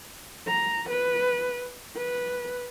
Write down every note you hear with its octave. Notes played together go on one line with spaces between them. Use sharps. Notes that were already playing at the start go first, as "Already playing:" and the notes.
A#5
B4
B4